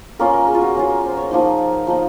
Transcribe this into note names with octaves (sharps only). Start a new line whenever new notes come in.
A#3 C#4 F4 A#4
A#4
G#4
F4
F#4
A#3 C#4 F4
A#4
C5
C#5
F3 A#3 D#4 C5
F3 A#3 D#4